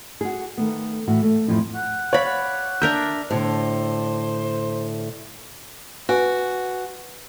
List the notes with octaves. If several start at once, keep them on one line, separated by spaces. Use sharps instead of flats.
F#4 G#4
D#3 A3 B3
A2 E3 F#4
A3
F2 A2 E3 F3
F#5
C#5 D5 F5 B5
F#5
D4 A#4 E5 G6
A2 D3 C5
F#4 B4 G#5